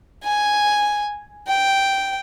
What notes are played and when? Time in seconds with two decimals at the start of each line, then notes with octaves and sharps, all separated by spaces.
0.24 G#5
1.47 G5